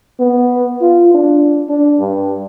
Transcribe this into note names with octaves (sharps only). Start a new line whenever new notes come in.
B3
F4
D4
D4
G2